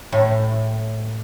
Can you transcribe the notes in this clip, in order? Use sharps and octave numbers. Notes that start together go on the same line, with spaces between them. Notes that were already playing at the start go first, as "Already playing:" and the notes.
A2